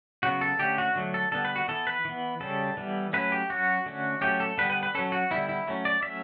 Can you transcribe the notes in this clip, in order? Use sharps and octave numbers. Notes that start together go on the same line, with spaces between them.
C#3 F#3 B3 F#4
A4
D3 A3 C#4 G4
F#4
D3 F#3 A3
A4
D3 G3 B3 A4
B4
F#4
E3 B3 A4
B4
E3 B3
C#3 G3 C#4 A4
E3 G3 B3
F#3 A3 C#4 B4
G4
F#3 C#4 F#4
D3 A3 C#4
F#3 A3 C#4 G4
A4
D3 G3 B3 B4
B4
B4
F#3 C#4 A4
F#4
D3 G3 B3 E4
E4
F#3 A3 C#4
D5
F#3 A3 C#4 E5